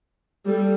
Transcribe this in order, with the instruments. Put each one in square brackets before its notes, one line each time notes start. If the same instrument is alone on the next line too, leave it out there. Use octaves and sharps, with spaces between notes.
[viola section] G3 A4